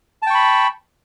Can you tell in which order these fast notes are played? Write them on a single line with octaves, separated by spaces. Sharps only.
A5 G5 C#6 B5